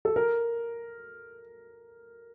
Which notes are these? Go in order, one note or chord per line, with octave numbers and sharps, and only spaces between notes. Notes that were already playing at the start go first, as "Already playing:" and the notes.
A4
A#4